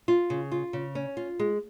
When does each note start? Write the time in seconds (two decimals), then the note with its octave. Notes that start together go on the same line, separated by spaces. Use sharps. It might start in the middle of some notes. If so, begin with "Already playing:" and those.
0.08 F4
0.30 C#3
0.51 F4
0.73 C#3
0.95 C#4
1.17 F4
1.39 G#3